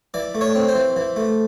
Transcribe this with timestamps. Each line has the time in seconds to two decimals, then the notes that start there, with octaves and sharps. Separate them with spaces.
0.14 E3 D5
0.35 A3
0.41 C#5
0.55 C4
0.69 C5
0.75 E3
0.96 E3
1.16 A3